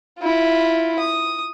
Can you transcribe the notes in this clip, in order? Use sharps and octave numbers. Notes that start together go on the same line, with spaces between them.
E4 F4
D#6